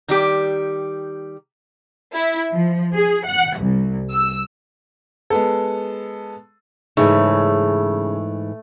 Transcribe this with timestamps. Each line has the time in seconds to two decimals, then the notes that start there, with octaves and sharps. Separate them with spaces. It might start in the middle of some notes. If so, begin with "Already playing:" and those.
0.08 D#3 G3 G4
2.13 E4
2.52 F3
2.95 G#4
3.26 F#5
3.60 C2
4.11 E6
5.30 G#3 B3 A4
6.97 G#2 C#3 E3 A3 D#4